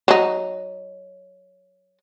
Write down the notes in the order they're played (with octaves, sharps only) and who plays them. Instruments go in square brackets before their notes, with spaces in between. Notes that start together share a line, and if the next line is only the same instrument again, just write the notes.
[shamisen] F#3 D#4